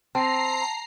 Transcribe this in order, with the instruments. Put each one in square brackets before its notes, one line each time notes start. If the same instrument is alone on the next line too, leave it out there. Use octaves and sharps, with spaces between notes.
[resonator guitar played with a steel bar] C4 [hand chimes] A5 [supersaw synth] A#5 C7